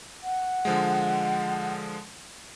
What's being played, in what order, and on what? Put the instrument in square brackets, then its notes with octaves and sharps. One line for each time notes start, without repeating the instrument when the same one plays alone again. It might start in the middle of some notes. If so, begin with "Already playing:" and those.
[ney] F#5
[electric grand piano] D3 F3 G#3